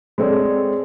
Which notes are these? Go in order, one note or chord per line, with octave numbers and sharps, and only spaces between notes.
G#3 C4 A4 C#5 D5